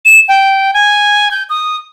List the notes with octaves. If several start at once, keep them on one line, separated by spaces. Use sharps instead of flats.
E7
G5
G#5
G6
D#6